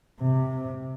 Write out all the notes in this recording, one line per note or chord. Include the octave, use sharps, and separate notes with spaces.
C3